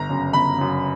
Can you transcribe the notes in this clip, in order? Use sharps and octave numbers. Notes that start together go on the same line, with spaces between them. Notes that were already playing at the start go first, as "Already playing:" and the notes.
Already playing: G1 A#5
F#2 C#3
G1 B5
F#2 C#3